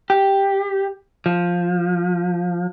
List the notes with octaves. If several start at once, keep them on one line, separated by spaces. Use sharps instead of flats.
G4
F3